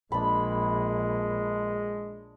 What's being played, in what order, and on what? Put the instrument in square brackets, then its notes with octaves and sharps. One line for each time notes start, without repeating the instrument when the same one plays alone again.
[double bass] A#1 [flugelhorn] G#3 [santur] D4 B5